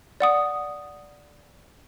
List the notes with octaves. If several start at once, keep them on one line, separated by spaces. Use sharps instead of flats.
D5 F#5 D#6